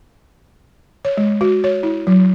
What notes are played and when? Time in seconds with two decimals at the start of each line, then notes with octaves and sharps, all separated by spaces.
1.05 C#5
1.17 G#3
1.41 F#4
1.64 C#5
1.83 E4
2.07 F#3